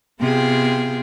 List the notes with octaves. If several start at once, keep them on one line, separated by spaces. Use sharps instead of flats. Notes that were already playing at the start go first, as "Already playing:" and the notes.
C3 B3 F4 G#4 G5